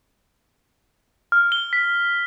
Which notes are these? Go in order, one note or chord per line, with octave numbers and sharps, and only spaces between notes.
F6
G7
B6